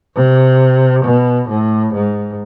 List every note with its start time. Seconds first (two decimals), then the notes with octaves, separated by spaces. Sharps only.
0.15 C3
1.04 B2
1.49 A2
1.94 G#2